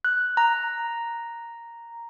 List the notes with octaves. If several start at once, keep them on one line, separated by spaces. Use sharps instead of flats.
F#6
A#5